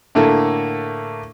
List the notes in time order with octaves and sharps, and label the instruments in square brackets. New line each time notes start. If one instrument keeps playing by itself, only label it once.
[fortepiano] A2 D3 A3 A#3